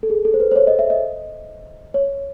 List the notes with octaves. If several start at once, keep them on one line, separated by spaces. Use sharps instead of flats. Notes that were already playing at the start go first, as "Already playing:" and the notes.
A4
G#4
A4
C5
B4
C5
C#5
D#5
E5
D#5
C#5